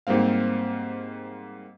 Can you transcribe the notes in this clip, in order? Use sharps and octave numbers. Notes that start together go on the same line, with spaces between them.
G#2 G3 A#3 C4 F5